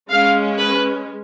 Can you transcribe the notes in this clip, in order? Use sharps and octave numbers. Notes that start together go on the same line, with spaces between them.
G#3 C#4 F5
B4